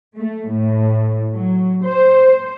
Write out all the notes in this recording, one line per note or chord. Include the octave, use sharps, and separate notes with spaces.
A3
A2
F#3
C5